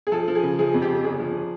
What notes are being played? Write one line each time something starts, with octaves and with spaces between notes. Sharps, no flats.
G#4
F3 A4
F3
G#4
C#3
F3 G#4
F2
G4
C#3
G1 G#4
F3